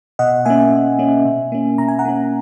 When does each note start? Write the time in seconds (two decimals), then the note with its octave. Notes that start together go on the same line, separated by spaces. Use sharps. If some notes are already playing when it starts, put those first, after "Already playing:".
0.19 B2 D#5 F#5
0.45 A#3 C#4 E5 G#5
0.72 B2
0.99 A#3 C#4
1.25 B2
1.52 A#3 C#4
1.78 B2 A#5
1.88 G#5
1.99 F#5 A#5
2.05 A#3 C#4